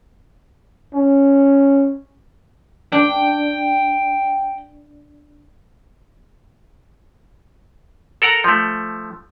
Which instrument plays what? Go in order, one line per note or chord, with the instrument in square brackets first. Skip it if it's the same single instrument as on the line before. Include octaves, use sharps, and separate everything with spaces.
[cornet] C#4
[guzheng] D4 [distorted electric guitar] G5
[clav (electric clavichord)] A4 A#4 F#5 A#5
F3 A3